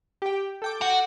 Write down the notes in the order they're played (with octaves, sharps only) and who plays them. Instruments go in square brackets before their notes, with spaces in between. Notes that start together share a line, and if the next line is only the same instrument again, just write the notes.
[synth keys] G4 G5
A4 G5 D6
[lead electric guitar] F#4 F#5